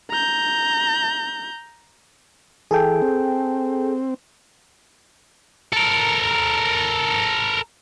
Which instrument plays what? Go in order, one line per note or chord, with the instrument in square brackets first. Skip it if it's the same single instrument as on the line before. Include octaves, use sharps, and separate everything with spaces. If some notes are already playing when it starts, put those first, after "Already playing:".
[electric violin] A#5 G6
[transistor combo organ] E3 [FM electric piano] G#4 A4 G5
[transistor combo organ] C4
[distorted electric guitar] A4 A#4